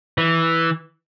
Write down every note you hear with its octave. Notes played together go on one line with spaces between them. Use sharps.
E3